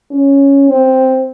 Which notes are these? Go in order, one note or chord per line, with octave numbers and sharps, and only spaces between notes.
C#4
C4